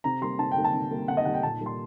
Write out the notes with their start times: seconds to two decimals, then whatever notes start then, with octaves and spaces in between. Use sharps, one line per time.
0.04 C3 A#5
0.21 G3 A#3 C6
0.39 C3 A5
0.52 G5
0.57 G3 A#3
0.65 A5
0.74 C3
0.91 G3 A#3
1.08 C3 F#5
1.17 D#5
1.25 G3 A#3 F#5
1.34 G5
1.43 A#2 A5
1.61 G3 A#3
1.66 C6